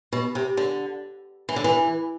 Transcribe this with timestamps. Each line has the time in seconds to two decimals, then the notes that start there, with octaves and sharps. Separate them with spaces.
0.13 B2
0.35 C3
0.57 D3
1.49 E3
1.56 D3
1.64 E3